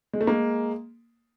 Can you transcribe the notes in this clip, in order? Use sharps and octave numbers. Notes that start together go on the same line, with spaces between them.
G#3
A3
G#3 A#3